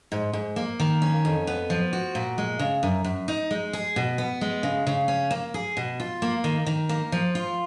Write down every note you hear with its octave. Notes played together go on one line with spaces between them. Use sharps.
G#2
G#2
A#3
D#3
C#4
F2
B3
F3
F#4
A#2
G#3
C#3
F#2
F#2
D#4
G#3
G#4
B2
B3
G#3
C#3
C#3
C#4
A#3
G#4
B2
F4
A#3
D#3
D#3
A#3
F3
F4